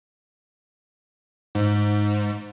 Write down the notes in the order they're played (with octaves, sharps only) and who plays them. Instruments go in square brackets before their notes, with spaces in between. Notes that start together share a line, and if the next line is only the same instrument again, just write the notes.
[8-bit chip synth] G#2